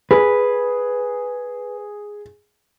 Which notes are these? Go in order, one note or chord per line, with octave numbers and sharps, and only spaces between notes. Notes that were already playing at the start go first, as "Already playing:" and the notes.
G#4 B4